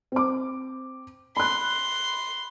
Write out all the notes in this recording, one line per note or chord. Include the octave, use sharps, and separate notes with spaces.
C4 D6
B5 C6 F#6